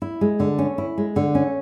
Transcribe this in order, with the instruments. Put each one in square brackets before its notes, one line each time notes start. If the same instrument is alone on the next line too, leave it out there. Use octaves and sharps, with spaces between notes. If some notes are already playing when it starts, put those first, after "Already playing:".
[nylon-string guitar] E4
G#3
D3
C#4
E4
G#3
D3
C#4